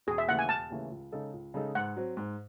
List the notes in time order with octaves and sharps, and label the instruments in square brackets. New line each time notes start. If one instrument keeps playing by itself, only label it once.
[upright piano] E1 [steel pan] G#4
[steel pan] E5
[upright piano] D#2 C#3 E3 A3 [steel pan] F#5
[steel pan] G#5
[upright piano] E1 [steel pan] A5
[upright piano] D#2 C#3 E3 A3
C#2
C#3 G#3 D#4 A4
C#2
C#3 G#3 D#4 A4
[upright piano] G#2 [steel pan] F#5
[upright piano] F#3 C4
G#2